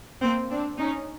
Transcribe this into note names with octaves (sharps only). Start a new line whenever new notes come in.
A#3 C4
C4 D4
C#4 D#4